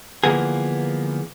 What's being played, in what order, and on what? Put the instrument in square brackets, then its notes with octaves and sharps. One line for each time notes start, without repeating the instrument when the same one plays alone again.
[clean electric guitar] D3 E3 F3 A#3 B3 G#4